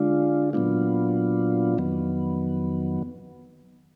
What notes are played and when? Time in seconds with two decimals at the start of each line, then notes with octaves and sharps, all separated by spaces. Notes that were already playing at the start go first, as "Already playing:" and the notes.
Already playing: D3 G#3 D4 F4
0.53 A#2 F#3 B3 D4 F4
1.78 F2 D#3 F#3 B3